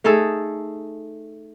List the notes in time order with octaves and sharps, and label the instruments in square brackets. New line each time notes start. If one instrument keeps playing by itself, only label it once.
[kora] A3 D#4 G#4 A4